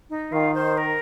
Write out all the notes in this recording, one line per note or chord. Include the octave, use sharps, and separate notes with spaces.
D#4
D#3 F4
C5
A#4